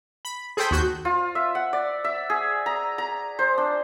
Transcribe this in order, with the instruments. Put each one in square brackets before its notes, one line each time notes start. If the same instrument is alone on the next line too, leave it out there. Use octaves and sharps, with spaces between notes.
[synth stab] B5
G#4 A4 C5 G5 B5
D#2 F#4 G6
[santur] F4
E5
F#5
D5
E5
G#4
A#5
A#5
C5
D4